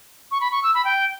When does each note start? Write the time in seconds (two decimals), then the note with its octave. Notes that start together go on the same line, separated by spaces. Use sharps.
0.31 C#6
0.40 B5
0.51 C#6
0.63 E6
0.74 B5
0.85 G5